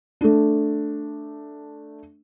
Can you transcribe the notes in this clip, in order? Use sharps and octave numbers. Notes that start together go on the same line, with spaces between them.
A3 D4